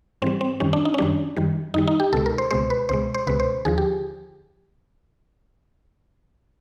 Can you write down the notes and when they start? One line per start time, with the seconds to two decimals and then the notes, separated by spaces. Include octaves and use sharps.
0.22 G#2 E3 G3 C4
0.41 C4
0.60 F#2 D#3 G3 C#4
0.73 D4
0.85 D#4
0.94 C#4
0.98 F#2 D#3 G3 D4
1.36 F#2 D#3 G3
1.74 F#2 D#3 G3 D#4
1.87 D#4
2.00 G4
2.13 C#2 B2 G#3 A4
2.26 A#4
2.38 C5
2.51 C#2 B2 G#3 C5
2.70 B4
2.89 C#2 B2 G#3 C5
3.14 C5
3.27 C#2 B2 G#3 B4
3.40 C5
3.65 D#2 D3 F3 G#4
3.78 G4